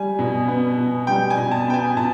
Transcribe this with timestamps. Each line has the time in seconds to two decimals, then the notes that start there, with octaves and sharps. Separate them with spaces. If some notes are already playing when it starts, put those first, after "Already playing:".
Already playing: G3 G#5
0.19 B2
0.48 B3
0.78 B2
1.07 G3 G5
1.30 G#5
1.37 B2
1.51 A5
1.67 B3 G5
1.74 G#5
1.97 B2 A5